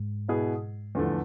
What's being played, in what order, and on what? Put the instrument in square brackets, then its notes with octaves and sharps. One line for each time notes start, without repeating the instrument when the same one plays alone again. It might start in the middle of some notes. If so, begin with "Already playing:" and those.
Already playing: [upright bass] G#2
[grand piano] B2 B3 E4 G#4
E2 D3 F3 A3